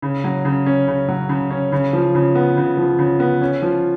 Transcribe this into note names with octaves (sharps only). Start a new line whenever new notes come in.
C#3
F#3
C#3
C#4
C#3
F#3
C#3
C#4
C#3
F3
C#3
B3
C#3
F3
C#3
B3
C#4
F3